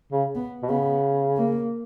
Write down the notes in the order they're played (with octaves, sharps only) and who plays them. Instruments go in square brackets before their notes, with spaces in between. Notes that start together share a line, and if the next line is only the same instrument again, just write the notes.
[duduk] C#3
[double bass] B3
[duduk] B2
[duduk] C#3 [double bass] B3
[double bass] A#3